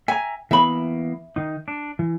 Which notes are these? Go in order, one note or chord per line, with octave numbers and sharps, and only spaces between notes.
E5 G#5 A#5
E3 A#3 B3 E5 B5
D#3 D#4
D4
E3